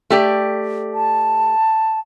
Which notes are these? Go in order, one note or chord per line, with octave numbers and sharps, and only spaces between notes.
A3 G4 D5
A5